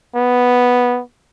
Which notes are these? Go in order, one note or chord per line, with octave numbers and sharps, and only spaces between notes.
B3